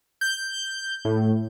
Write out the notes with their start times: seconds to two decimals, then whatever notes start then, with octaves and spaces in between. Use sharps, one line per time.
0.21 G6
1.05 A2